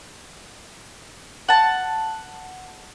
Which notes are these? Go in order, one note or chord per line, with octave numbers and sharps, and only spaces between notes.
F#5 A5